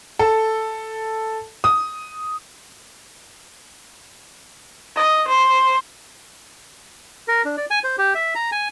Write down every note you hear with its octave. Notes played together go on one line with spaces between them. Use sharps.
A4
D#6
D#5
C5
A#4
D4
D5
G#5
C5
G4
E5
A#5
G#5